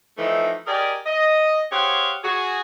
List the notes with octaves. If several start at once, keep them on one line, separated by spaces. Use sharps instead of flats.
E3 F3 A3 D#4
G4 G#4 A#4 D5 D#5 G#5
D#5
G4 G#4 C5 C#5 F5 F#5
F#4 G#4